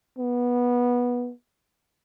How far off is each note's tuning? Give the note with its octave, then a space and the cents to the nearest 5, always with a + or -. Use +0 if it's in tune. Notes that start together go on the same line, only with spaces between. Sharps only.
B3 -15